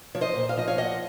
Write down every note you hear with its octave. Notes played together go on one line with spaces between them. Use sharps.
F3 C#5
C5 D#5
A#2
F5
F3 D#5
C#5 F5
A#2 D#5 F#5